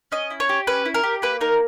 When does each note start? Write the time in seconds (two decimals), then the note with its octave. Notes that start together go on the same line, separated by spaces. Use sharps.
0.12 C#4 D#5
0.30 E4
0.40 C#5
0.49 G4
0.67 C#4 B4
0.85 E4
0.94 A#4
1.03 G4
1.22 A#3 B4
1.41 D#4 A#4